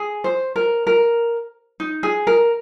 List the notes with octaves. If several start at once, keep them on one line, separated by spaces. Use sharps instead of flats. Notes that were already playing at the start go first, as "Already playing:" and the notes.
Already playing: G#4
C5
A#4
A#4
D#4
G#4
A#4